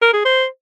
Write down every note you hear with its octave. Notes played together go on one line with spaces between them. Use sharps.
A#4
G#4
C5